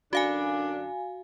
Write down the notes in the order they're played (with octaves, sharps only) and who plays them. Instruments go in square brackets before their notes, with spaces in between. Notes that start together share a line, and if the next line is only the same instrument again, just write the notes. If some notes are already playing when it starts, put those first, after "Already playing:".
[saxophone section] F#2 D3 D4 [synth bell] F#4 F5 G#5